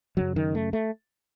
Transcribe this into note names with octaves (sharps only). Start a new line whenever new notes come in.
F#2 C#3 F#3
D#3
A3
A3